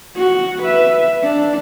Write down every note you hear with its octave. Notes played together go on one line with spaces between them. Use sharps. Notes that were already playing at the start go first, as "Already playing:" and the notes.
F#4
B4 E5
D4